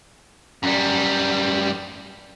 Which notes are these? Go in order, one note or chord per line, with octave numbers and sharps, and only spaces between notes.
F#2 G3